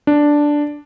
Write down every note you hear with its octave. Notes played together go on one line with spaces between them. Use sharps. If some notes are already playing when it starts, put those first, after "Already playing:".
D4